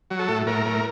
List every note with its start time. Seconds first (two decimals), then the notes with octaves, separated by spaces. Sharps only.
0.10 F#3
0.19 A4
0.28 A2
0.47 A2 A#4
0.66 A2